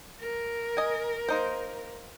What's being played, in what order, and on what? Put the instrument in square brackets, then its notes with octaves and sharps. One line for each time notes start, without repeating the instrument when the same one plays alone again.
[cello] A#4
[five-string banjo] D#5 G#5
A#3 D#4 C5